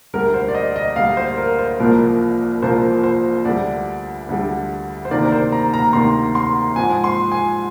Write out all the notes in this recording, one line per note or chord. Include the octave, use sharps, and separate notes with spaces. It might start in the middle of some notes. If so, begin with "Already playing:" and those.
D2 D3 G3 A#4
C5
D5
D#5
D#5
D2 D3 G3 F5
C5
A#4
C5
C2 A#2 F3 A#3 A#4
C2 A#2 F3 A#3 C5
C5
D2 D3 G3 D5
D2 D3 G3
C5
D2 C3 D#3 A#3 D5
A#4
C5
A#5
A#5
D2 C3 D#3 A#3 C6
C6
G#2 F3 G#3 C4 G#5
C6
G#5